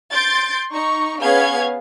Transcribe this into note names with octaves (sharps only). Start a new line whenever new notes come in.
C6 G6 A6 D7
D#4 C#6
B3 C#4 G#4 F5 G#6